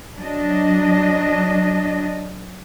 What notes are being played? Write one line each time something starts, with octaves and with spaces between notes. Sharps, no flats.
F#3 D4 D#5